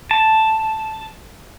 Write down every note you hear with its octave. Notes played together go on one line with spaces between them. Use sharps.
A5